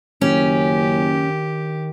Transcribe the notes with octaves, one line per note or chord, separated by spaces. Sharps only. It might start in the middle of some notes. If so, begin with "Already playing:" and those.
F#1 D#3 C#4 G4